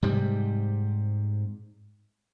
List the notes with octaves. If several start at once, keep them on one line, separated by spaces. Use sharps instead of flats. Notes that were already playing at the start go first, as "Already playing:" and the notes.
G#2 C3 G3